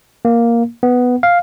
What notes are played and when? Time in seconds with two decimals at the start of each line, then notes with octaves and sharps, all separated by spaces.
0.25 A#3
0.83 B3
1.23 F5